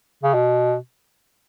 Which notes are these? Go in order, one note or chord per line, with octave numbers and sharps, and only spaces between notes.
C#3
B2